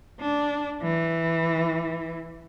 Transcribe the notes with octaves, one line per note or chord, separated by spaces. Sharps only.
D4
E3